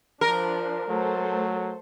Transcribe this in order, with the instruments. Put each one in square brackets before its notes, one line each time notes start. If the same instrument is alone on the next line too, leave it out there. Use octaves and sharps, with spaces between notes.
[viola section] F3 D4 [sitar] A#4
[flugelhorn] F#3 [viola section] A3 A4 C5